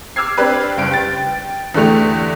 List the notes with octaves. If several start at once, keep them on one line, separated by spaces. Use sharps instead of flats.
D6 E6 F6 G#6 C7
C4 D4 G4 B4
F#1 G2 D7
G5 A6
E2 D3 E3 A3 G4 F7